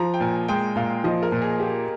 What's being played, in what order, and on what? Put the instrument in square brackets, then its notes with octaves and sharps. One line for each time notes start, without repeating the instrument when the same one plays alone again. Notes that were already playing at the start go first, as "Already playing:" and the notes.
Already playing: [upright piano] F3 [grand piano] A#5
[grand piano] G5
[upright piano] A#2 [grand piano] G#5
[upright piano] G#3 [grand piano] G5
[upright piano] A#2 [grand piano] F5
[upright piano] F3 [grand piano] D#5
[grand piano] A#4
[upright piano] A#2
[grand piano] G#4
[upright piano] A#3 [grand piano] G4